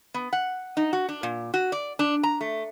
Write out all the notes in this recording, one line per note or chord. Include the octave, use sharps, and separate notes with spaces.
B3
F#5
D#4
F#4
D4
A#2
F#4
D5
D4
A#5
A3